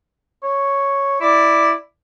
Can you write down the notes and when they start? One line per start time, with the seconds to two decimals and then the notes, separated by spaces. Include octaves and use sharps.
0.43 C#5
1.20 E4 D5